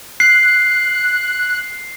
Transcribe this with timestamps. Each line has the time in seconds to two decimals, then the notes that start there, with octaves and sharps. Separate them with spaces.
0.20 F#6 C7